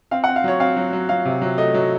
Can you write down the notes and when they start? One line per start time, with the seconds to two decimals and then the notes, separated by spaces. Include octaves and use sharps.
0.11 C4 F5
0.24 F#5
0.28 C4
0.36 F5
0.44 F#3 C#5
0.60 C4 F5
0.76 F#3
0.93 F#3
1.09 F#3 F5
1.25 C3
1.42 F#3
1.58 A3 D#5
1.74 F#3